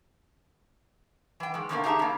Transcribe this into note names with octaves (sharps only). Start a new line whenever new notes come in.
E3 G5
D#3 G#3
B2 D3 D#3 F3 A3 A#3
D#4 G4 G#4 E5 A5 A#5
C#3 A#3